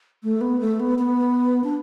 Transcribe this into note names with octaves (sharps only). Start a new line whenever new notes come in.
A3
B3
A3
B3
B3
D4